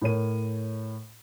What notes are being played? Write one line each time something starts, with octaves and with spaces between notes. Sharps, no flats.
A2 A#4 C#5 D#7